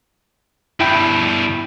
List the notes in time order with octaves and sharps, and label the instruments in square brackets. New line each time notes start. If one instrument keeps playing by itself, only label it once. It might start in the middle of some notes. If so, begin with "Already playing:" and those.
[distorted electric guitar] G2 B2 [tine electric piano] E4 G5 B5